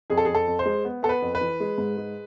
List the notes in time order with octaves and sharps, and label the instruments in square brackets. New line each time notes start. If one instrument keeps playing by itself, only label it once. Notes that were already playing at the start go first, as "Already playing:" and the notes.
[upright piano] F2 G#4
A4
F2 G#4
A4
F2
C5
G#3
B3
B3 A4
B4
F2
B4
E3
G#3
G#2
G#3